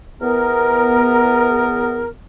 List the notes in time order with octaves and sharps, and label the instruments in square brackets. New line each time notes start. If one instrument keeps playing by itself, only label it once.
[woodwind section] E2 B3 A#4